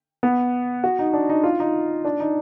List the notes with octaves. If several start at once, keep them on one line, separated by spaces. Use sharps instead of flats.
B3
F#4
D#4
D4
D#4
F4
D#4
D4
D#4